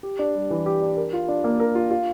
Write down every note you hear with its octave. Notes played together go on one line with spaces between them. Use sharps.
G4
D4
G3
E3
G4
D4
A#4
F4
D4
A#3
A#4
F4
F4